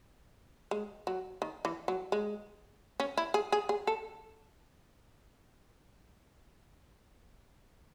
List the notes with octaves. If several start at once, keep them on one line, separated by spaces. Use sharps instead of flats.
G#3
F#3
D#3
E3
F#3
G#3
C#4
E4
G#4
G#4
G#4
A4